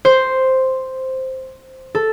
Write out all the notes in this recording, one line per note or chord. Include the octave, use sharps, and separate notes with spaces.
C5
A4